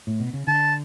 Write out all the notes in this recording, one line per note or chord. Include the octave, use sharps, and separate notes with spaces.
A2
B2
C#3
D3 A5